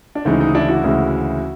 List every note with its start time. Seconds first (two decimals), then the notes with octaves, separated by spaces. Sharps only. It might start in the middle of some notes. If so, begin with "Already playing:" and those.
0.15 D4
0.25 D2 C#3 E3 G#3 D#4
0.41 D#4
0.54 D4 E4
0.69 E4 F#4
0.84 D2 C#3 E3 G#3